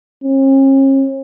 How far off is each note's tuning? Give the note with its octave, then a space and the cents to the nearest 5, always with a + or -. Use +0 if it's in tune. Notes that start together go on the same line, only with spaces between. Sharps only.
C#4 -45